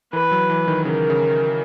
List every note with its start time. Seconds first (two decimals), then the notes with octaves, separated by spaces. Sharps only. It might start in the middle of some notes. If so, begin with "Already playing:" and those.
0.13 E3 B4
0.32 F#3
0.50 E3
0.68 D#3
0.85 C#3 A#4
1.10 C#3